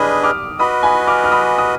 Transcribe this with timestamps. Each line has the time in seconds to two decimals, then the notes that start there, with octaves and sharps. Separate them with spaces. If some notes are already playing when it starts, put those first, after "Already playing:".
Already playing: D4 G#4 B4 D#5 B5 D#6 F6
0.23 D6 F6
0.59 F#4 B4 D#5 B5 D#6
0.83 G#5 B5
1.07 D6 F6
1.24 F6
1.32 B5 D#6
1.58 D#6